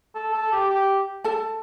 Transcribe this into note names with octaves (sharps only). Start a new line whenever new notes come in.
A4
A4
G4
G4
A4 A5